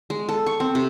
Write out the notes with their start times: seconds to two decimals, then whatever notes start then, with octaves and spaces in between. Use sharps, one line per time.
0.10 G#3
0.29 A4
0.46 C#6
0.60 C4
0.75 C3